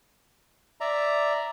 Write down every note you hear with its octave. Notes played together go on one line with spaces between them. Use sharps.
D5 E5 A#5